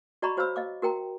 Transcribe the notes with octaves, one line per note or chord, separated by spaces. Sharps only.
F#4 D5 D#5 A#5 B5 C#6
F#4 C5 C#5 F5 B5 E6
D#5 F5 D6
F#4 A#4 G5 A#5